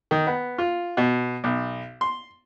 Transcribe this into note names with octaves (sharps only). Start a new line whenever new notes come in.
D#3
B3
F4
B2
B1
C6